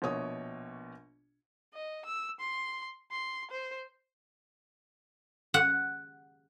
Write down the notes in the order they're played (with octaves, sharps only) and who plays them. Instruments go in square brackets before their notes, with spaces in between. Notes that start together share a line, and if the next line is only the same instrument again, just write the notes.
[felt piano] A#1 B2 C#5 D#6
[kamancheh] D#5
E6
C6
C6
C5
[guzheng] F#5